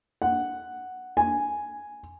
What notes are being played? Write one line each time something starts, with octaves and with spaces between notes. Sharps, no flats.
F#5
G#5